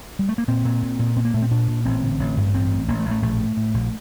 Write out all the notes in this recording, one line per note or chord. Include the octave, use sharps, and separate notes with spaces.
G3
A3
A#3
A#2 C4
A#2
A#2
A#2
A#2 C4
A#3
A#2 A3
C4
A#2 D4
A#2
A1 C4
D3
A1
G2
A1 C4
A1
A1 A#3
A3
A1
A3
A#1 A3
A2
A2
A#1